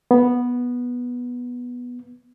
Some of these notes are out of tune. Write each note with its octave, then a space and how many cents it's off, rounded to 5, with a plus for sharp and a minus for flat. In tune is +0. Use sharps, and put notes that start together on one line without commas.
B3 -10